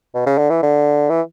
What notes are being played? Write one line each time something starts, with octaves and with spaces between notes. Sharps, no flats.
B2
C#3
D3
E3
D3
E3